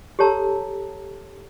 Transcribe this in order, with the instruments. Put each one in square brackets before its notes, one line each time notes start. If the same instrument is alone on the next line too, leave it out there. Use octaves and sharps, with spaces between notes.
[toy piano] G4 A4 C#5 A5 A#5 E6